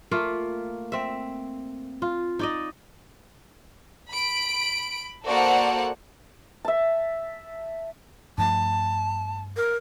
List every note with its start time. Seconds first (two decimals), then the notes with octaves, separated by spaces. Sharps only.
0.11 A3 A#3 F4
0.92 C4 E5
2.02 F4
2.39 D#4 D5 D#5
4.09 B5 D7
5.25 A#3 F#4 A4 C5 D5 F#5
6.65 E5 A5
8.38 G2 F3 A3 A5
9.56 A#4